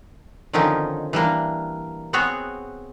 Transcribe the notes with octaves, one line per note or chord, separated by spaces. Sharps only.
D3 D#3 F3 C4 C#4 D#4
E3 G3 A#3 D4
B3 C4 F#4 G#4 C#5